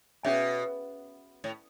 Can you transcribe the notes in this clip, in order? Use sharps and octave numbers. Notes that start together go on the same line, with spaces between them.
B2 C#4 G#4 C#5 E5 G#5
A2